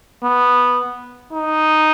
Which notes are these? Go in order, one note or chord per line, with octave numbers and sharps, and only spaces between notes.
B3
D#4